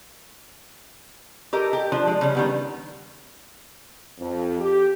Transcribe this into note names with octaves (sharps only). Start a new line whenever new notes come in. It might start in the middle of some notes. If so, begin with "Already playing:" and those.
G4 A4 A#4 D#5
G4
F3 D4
G#3
C#3 G3 C#4
D#3 G3 B3
F2
G4